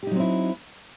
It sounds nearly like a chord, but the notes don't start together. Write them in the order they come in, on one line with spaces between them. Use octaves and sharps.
G4 D#4 F#3 C4 E4